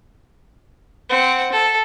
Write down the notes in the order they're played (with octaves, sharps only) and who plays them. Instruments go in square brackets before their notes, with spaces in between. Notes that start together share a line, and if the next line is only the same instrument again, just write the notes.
[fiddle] C4 F#5
A4